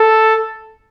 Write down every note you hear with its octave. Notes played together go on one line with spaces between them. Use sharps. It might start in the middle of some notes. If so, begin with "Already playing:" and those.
Already playing: A4